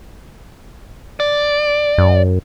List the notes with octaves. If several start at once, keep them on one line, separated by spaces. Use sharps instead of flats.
D5
F#2